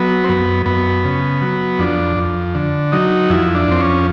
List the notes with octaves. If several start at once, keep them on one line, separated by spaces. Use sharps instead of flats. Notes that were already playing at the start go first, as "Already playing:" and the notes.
Already playing: F#3 B3
C4
F#2 B3
F#2 B3
C#3
F#3
F2 D4
F2
D3
F#3 D#4
F2 E4
D4
F2 C4
C#4